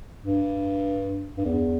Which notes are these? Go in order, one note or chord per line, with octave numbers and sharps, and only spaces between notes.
G2
G2
E2